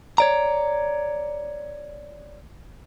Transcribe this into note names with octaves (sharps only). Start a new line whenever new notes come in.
C#5 D5 A#5